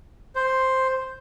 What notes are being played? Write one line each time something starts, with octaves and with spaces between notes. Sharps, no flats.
C5